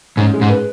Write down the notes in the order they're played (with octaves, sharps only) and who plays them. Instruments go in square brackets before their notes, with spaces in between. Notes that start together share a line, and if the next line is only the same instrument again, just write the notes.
[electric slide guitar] G#2 [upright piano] C#4
[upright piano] G#3
[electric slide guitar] G#2
[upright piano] B4